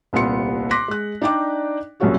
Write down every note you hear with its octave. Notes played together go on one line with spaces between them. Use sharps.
D#1 C2 A#2 B3 C6 C#7
C6 D6 F#6 A#6 B6
G#3 F#6
D4 D#4 D5 G5 D6
C2 F#2 A#2 C#4 F#4 G#4